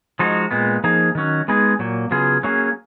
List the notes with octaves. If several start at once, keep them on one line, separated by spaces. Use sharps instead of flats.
F3 G#3 D#4 F#4
A#2 G#3 B3
F3 A#3 D#4 G#4
D#3 F#3 C#4
G#3 B3 D#4 G#4
A#2 F#3 A#3
C#3 F#3 B3 F4 G#4
F#3 A#3 C#4 G#4